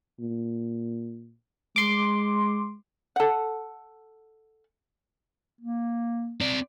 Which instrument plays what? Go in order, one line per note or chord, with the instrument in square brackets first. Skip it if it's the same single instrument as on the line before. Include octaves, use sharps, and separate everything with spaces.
[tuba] A#2
[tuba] G#3 [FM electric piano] C6 D6
[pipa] A4 F#5
[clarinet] A#3
[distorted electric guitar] C4 D5